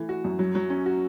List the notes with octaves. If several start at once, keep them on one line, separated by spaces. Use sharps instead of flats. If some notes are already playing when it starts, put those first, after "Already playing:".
Already playing: E3 A3
F#4
F#2
F#3
F#3
C#4
F#4